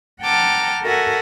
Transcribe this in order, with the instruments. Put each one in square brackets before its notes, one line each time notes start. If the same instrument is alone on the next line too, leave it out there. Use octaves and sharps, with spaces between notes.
[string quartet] F#5 G5 A5 A#5 D6 F6
F#4 A4 A#4 E5 F#5 G#5